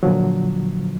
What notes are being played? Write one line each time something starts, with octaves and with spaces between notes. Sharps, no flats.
A#2 D3 F3 F#3